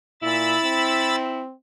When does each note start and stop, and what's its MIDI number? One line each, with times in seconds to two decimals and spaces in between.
0.23 0.56 46
0.23 1.41 64
0.23 1.16 83
0.23 1.16 88
0.23 1.16 93
0.63 1.53 60